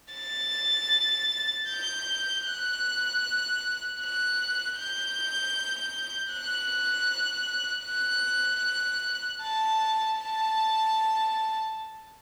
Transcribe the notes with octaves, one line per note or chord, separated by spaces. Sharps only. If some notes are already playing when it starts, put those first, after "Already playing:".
A6
G6
F#6
F#6
G6
F#6
F#6
A5
A5